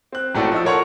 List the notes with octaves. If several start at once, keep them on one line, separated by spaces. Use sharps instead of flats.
C4 F#6
G#1 A2 A3 F#4 D5
F3 D#5 E6
A4 A#4 C#5 F#5 C6 C#6